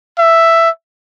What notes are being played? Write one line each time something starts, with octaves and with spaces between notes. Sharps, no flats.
E5